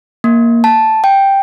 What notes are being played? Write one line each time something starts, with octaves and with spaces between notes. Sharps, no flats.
A#3
A5
G5